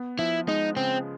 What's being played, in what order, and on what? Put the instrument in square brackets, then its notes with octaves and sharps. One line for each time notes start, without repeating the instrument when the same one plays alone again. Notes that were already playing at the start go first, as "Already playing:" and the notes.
Already playing: [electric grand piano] B3
[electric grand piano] F3 [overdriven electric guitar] E4
[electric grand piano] G#3 [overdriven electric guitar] D#4
[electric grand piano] C#3 [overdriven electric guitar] C4